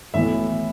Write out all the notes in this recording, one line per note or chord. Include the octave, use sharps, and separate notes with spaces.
B1 A2 E3 E5